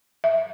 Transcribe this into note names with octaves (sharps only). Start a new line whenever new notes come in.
E5